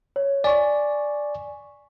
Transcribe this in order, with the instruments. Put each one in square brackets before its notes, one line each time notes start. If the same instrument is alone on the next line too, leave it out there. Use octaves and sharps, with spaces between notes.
[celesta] C#5
[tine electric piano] D5 [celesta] G#5 C#6